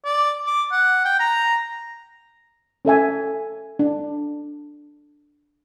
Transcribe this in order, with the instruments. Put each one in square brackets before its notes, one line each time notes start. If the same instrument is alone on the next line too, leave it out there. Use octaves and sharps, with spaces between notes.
[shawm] D5
D6
F#5
G5
A#5
[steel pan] C#4 A4 E5 G#5
D4